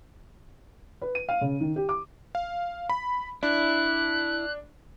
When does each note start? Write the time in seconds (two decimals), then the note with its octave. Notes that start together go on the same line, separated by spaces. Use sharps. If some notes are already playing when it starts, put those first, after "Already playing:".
1.02 B4
1.15 D#7
1.29 F5
1.41 C#3
1.61 D#3
1.76 G4
1.89 D6
2.35 F5
2.90 B5
3.43 D4 E4 F#6